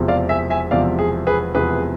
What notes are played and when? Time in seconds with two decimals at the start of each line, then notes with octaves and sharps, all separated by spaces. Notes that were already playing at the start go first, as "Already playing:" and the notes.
Already playing: E1 E2 C3 F3
0.08 D5 F5
0.29 E5 G#5
0.50 E5 G#5
0.71 E1 E2 C3 F3 D5 F5
0.99 G#4
1.27 G#4 B4
1.54 E1 E2 C3 F3 G#4 B4